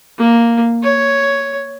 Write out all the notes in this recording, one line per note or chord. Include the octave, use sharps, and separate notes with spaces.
A#3
C#5